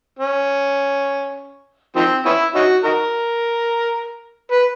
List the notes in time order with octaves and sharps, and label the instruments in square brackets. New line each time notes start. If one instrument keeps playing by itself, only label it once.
[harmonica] C#4
D#3 F3 C4
B3 C#4 E4
C#4 D#4 F#4
D#4 F#4 A#4
B4